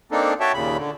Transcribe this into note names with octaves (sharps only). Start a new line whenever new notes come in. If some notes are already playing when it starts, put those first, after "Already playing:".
A#3 C4 D4 D#4 A4
F#4 C#5 E5 G5 A5
D#2 A#2 C#3 B5
D3